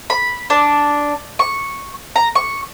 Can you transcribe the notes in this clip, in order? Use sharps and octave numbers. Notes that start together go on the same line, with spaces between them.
B5
D4
C#6
A#5
C#6